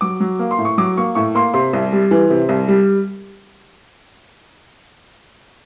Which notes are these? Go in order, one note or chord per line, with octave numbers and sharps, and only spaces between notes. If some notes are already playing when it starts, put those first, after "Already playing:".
F#3 D6
F#3
A#3
C6
A2
C#6
F#3 D6
A#3 C#6
A2 C#6
A#3 C6
C3 C6
C2
G3
E3
C3
C2
G3